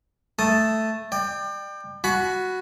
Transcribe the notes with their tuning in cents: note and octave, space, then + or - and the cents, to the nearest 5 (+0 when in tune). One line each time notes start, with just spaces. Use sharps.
A3 +0 A5 +0 D#6 +0
D5 +35 G5 +10
F#4 +0 G#5 +40 B5 +0